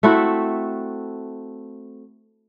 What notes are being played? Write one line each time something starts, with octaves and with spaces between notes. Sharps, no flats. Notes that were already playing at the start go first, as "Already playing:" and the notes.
A3 C4 E4 F#4